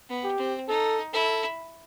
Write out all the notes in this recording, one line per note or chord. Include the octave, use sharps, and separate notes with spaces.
B3
G4
C4
D#4 A4
E4 A4